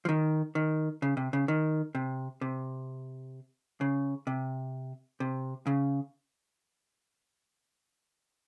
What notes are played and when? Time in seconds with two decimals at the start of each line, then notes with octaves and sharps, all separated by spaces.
0.05 F3
0.09 D#3
0.55 D#3
1.02 C#3
1.17 C3
1.33 C#3
1.48 D#3
1.95 C3
2.41 C3
3.81 C#3
4.27 C3
5.20 C3
5.67 C#3